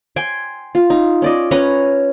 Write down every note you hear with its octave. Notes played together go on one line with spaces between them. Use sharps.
G5 G#5 C6
F4
D#4
C#4 D5 D#5
C#4 B4 C#5 A#5